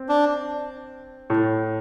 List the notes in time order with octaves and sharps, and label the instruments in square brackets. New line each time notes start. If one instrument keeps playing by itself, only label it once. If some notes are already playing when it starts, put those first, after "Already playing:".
Already playing: [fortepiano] C4
[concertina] D4
[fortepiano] A2